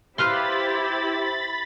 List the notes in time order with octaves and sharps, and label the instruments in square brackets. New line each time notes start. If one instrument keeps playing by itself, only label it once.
[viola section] E4 G4 C5 [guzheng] B4 F5 C6 [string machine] B5 A6